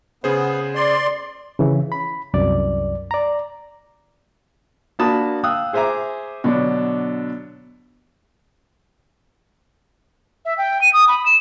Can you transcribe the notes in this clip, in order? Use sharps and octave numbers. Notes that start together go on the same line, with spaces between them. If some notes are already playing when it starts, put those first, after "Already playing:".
C#3 B3 G#4 C5
D5 C6
C#3 E3
B5
C2 F#2 D5
D5 A#5
A#3 D4 F#4 A5 B5 D#6
F5 G5 D#6 E6 F#6
G#4 C5 E5 G#5 A#5 D6
B2 D3 F#3 D4
E5
G5
D#7
D#6
B5
E7